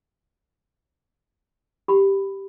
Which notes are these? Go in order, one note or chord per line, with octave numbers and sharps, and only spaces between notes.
G4 B5